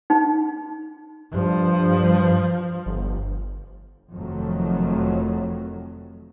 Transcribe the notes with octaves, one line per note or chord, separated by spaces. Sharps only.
D#4
G2 F3
G1
F1 F2 D#3 F#3 A3